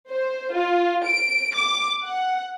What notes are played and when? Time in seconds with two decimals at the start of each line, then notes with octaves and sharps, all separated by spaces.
0.10 C5
0.53 F4
1.05 D7
1.55 D6
2.04 F#5